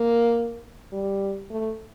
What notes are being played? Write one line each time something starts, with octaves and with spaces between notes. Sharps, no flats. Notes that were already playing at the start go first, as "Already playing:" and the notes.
Already playing: A#3
G3
A3